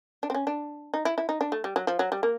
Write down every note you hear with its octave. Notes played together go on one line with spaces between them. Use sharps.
D4
C4
C#4
D4
D#4
E4
E4
D#4
D4
A3
G3
F#3
F3
F#3
G3
A#3